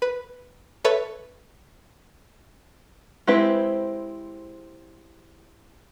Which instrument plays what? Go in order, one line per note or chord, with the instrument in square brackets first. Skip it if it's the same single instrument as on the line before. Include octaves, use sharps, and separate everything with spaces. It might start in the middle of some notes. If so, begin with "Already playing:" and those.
[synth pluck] B4
A4 B4 C#5 E5
[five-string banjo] G#3 C4 E4 G4 B4